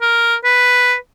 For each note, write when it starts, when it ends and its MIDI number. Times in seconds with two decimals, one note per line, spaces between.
0.01 0.35 70
0.44 0.95 71